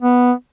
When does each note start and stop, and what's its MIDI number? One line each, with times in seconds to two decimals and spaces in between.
0.02 0.32 59